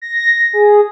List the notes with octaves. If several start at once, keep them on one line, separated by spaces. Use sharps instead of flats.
A#6
G#4